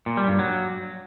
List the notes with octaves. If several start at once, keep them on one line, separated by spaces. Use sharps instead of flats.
A#2
G3
G2
F#3